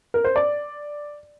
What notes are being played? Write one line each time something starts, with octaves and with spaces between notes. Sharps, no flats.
A#4
C5
D5